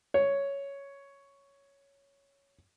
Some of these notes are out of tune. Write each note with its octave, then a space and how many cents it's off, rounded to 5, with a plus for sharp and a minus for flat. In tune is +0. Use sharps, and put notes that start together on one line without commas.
C#5 +5